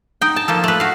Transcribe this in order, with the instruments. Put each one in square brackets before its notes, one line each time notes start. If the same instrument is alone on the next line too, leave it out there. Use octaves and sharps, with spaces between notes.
[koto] D#4 G5
A5
F3 A#3 A4
A3 B4
F#4 F5